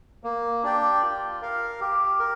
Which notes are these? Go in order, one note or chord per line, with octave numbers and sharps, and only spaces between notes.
A#3
D4 G4 D5 G5
F4
A#4 F5
G4
A#4